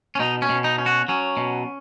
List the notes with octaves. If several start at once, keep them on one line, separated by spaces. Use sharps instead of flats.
C#4
B2 D#4
C#4
B2
D#4
C#4
F#4
F#3 C#4
B2